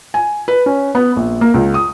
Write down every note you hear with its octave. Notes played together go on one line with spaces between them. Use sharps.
G#5
B4
C#4
B3
A#1
A#3
C#2
D#6